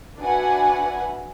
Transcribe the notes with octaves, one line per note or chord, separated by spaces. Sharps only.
D4 F#4 B4 E5 F#5 G#5